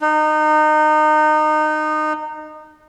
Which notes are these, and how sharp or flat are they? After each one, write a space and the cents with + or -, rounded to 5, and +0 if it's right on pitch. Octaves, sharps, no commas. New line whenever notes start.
D#4 -25